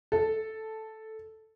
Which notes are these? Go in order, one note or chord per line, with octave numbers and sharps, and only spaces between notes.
A4